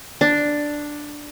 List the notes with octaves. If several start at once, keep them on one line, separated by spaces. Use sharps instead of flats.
D4